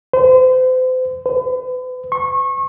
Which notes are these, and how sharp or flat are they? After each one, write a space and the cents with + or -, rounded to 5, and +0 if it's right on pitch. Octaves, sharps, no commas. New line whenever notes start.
C5 -35
B4 +40
C#6 -30